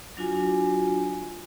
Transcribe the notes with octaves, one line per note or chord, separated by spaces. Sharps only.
F#3 D4 F4 F#4 G#5